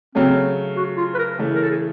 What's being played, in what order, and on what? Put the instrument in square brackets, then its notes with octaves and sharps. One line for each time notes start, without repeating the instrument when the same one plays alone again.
[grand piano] C#3 F#3 A3 C#4 [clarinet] C4
[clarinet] F#4
F4
B4
A#4
[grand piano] C#3 E3 A3
[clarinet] A#4
A4
G#4